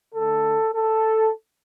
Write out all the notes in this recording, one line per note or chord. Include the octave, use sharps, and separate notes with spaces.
D3 A3 A4
A4